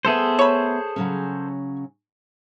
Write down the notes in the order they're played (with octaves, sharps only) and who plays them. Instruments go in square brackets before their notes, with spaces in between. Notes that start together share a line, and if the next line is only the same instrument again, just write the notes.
[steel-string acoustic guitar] A3 B3 E5 [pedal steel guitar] G#4 A4 C5
[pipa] C#5 B5
[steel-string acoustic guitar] C#3 F#3 C#4